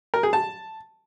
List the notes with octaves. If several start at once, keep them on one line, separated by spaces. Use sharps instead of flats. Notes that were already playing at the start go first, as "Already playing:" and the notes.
A#4
G#4
A5